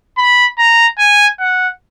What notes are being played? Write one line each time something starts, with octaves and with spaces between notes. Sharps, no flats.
B5
A#5
G#5
F#5